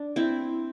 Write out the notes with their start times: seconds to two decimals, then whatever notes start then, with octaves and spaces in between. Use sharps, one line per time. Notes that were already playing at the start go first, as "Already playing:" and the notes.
Already playing: D4
0.16 C4 E4